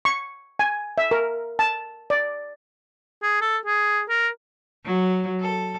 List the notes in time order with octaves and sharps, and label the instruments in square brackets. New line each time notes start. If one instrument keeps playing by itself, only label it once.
[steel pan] C#6
G#5
E5
A#4
A5
D5
[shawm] G#4
A4
G#4
A#4
[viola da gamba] F#3
A4